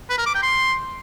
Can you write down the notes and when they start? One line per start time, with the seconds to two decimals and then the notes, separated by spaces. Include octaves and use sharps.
0.10 B4
0.18 A#4
0.26 D6
0.34 G5
0.43 C6